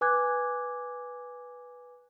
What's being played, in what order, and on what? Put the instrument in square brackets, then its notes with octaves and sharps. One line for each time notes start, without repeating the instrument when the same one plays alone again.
[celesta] B4 G#5 D6 F#6 G#6